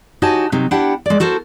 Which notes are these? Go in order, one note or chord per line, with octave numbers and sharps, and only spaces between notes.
D#4 F#4 G4 C#5 G#5 A5
C3 F#3 D#4
D4 E4 G4 F#5 G5
G#3 D5
F#4 A4 A#4 C5